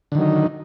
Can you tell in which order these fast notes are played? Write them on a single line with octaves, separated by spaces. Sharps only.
D3 D#3 F#3 D#4